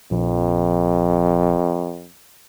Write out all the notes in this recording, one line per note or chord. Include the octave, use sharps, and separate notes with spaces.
A#1 F2